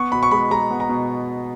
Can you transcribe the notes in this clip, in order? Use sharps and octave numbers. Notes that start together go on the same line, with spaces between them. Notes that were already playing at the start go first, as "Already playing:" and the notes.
Already playing: B3 C#6
B2 B5
C#6
G#3 B5
G#3 A#5
B3
A#5
B2